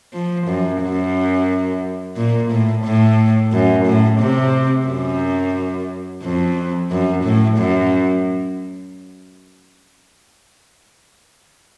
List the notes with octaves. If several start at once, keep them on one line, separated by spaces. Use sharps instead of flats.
F3
F#2
F#2
A#2
A2
A2
F#2
A2
C3
F#2
F2
F#2
A2
F#2